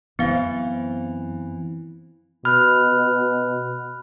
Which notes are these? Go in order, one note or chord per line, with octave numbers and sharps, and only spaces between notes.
F#2 E3 B3 C4 F5
B2 B5 F6 F#6